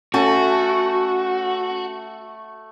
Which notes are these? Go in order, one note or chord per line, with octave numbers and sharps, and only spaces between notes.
A3 C#4 F#4 A5